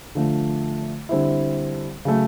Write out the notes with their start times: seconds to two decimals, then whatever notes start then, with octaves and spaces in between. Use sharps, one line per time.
0.15 D3 F3 A3
1.09 D3 G3 C4 E4
2.05 C#3 F#3 A3